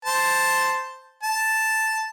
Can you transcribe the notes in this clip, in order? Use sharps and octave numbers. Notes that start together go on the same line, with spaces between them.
C5 A5
A5